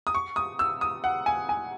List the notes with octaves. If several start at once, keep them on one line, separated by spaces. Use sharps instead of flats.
D#6
C#6
D#6
E6
D#6
F#5
G#5
G#5